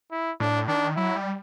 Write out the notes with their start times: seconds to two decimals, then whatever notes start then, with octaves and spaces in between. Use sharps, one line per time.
0.12 E4
0.40 A2 D4
0.68 D#3 D4
0.96 F#3 E4
1.16 G3